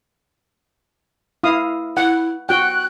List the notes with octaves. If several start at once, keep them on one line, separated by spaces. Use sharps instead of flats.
E4 F5 D#6
E4 F#5
F#4 G5 F#6